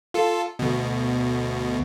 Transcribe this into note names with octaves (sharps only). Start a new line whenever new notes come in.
F4 A4
D2 B2